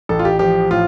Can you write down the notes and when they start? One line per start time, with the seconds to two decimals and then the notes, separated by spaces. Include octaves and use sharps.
0.09 A1 A4
0.19 F4
0.25 G4
0.39 F3 G4
0.71 A2 F4